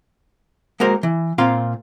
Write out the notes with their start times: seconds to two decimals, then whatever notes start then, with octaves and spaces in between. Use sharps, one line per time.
0.80 G#3 A#3 F#4 A#4 C5
1.03 E3
1.38 A#2 C4 F4 F5 C6